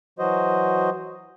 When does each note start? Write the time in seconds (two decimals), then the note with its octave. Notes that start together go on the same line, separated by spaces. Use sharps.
0.19 E3 F#3 F#4 C5 D#5